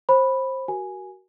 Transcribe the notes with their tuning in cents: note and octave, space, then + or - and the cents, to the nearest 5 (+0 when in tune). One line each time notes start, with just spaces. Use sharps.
C5 +20 B5 +0
F#4 +25 A#4 +10 G#5 +0